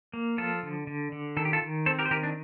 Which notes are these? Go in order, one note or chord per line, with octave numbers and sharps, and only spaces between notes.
A#3
F3 F4 A4
D3
D3
D3
D#3 A4
G4
F4 A4
D#3
C4 A4 C5
G4 A#4
C5
D#3 G4 A#4
D4